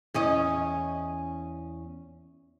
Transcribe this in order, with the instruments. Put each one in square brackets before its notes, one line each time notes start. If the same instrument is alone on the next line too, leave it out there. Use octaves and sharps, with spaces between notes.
[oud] E2 C#4 D#5